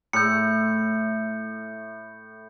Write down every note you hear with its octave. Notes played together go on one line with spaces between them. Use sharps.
A2 G6 C#7